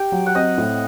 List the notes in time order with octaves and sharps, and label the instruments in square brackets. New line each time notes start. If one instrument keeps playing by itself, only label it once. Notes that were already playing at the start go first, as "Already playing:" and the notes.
Already playing: [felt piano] G4 [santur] G5
[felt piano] F#3
[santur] F#5
[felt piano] C4 [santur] D#5
[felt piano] A2